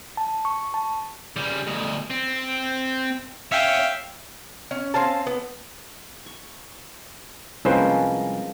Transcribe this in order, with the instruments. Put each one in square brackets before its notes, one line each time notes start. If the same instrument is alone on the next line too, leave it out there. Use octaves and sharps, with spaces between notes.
[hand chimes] A5
C#6
A5
[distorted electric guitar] C#3 G3
D2 B2
C4
[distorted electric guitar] C#4 [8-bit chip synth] E5 F5 G5
[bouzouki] C#4
C4 C#4 F5 A5
B3
[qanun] C#6
[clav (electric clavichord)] C2 [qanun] F3 G#3 A#3 [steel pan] C#4 B4 C5